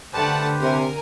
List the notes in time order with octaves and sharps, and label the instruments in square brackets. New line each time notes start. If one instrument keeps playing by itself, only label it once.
[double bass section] D3 [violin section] A3 F#5 A5 [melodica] G4 B4 C5
[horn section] C3 [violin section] A#4 G#5